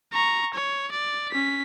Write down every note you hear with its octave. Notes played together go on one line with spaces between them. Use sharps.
A#5 C#6
C#5
D5
C#4 B6